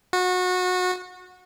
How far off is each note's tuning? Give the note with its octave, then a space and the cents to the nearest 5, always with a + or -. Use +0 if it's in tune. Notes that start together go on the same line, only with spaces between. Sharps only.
F#4 -25